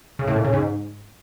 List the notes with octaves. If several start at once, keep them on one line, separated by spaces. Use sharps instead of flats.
C#3
A2
A#2
C#3
G#2